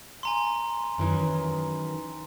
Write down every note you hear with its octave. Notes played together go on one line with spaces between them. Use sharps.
G#5 A#5 C6
F#2 D#3 E3